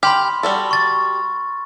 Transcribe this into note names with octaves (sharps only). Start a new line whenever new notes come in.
G4 B5 C6 F6
G3 F#4 A4
C#6 A6